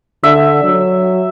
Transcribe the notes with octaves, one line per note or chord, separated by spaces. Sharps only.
D3 E5
F#3